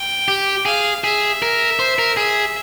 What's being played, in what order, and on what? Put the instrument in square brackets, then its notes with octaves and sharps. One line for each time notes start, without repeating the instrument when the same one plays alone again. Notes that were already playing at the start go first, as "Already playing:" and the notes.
Already playing: [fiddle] G5
[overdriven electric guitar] G4
[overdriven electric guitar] G#4 [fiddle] F5
[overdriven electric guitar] G#4 [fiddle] E5
[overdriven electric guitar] A#4
C5
A#4
[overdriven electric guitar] G#4 [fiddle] E5